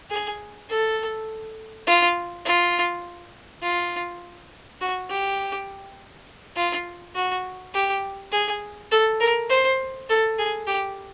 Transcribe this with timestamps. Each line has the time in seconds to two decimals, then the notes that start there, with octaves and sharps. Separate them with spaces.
0.11 G#4
0.69 A4
1.87 F4
2.45 F4
3.62 F4
4.81 F#4
5.10 G4
6.56 F4
7.15 F#4
7.74 G4
8.32 G#4
8.91 A4
9.20 A#4
9.49 C5
10.09 A4
10.38 G#4
10.67 G4